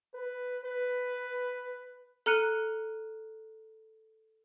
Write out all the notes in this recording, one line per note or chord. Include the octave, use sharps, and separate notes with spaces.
B4
B4
A4 A#5 F6 F#6 C#7 D#7